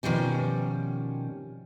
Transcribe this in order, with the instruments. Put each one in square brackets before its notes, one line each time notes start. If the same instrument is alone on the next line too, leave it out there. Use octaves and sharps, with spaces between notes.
[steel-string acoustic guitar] B2 D#3 F3 G3 C#4